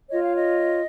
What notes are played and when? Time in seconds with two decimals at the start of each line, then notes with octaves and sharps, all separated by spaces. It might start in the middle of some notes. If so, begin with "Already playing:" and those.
0.09 F4 C#5 D#5
0.22 F5
0.36 D#5